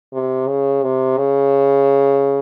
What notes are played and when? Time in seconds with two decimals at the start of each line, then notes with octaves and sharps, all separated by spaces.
0.13 C3
0.48 C#3
0.83 C3
1.17 C#3